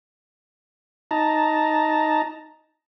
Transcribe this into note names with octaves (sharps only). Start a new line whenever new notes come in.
D#4 A5 A#5